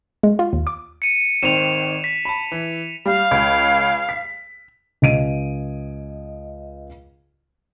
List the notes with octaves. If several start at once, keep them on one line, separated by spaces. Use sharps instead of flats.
G#3
F4
D#2
D6
C#7 D#7
G#1 D#3 C4 E7 F7
B6
A5 B5
E3
G3 F5
C#2
B6
C#2 D#5 D7 D#7